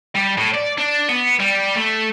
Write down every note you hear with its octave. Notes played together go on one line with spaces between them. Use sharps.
G3
A2
D5
D4
B3
G3
A3